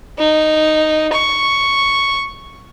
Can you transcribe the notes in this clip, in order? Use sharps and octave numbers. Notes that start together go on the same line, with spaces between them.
D#4
C#6